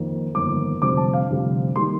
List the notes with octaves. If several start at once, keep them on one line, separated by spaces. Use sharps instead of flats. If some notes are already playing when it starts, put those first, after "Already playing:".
Already playing: F2 D#3 A#3
G1 F2 D#3 A#3 D6
F1 F2 D3 G3 C4 D6
A5
F5
F1 F2 D3 G3 C4
D#3 G3 A#3 C6